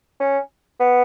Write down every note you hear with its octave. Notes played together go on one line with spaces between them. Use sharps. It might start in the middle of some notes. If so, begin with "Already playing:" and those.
C#4
B3